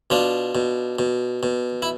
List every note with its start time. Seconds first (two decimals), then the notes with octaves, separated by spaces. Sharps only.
0.10 B2 D4 F4
0.55 B2
0.99 B2
1.43 B2
1.82 E4